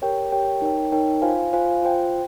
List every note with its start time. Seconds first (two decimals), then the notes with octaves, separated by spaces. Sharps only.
0.02 G4 A#4 C#5 G5
0.32 G4 A#4 C#5 G5
0.62 D#4 A#4 C#5 G5
0.92 D#4 A#4 C#5 G5
1.22 F4 C5 F5 G#5
1.53 F4 C5 F5 G#5
1.82 F4 C5 G5